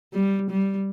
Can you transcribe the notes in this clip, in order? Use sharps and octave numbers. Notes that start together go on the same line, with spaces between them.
G3
G3